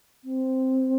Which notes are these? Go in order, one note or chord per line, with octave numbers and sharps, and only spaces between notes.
C4